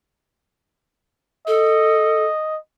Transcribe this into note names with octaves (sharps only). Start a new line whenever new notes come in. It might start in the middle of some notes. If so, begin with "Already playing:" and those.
A4 D#5